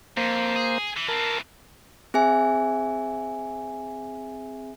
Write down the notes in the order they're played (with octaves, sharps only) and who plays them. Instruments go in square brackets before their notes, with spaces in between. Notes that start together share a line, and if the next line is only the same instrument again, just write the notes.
[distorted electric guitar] F2 [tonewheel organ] A#3 C5
[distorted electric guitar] G#4
E3
[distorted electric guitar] E3 C4 [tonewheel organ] A#4 A5
[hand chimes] C4 G#4 E5 G#5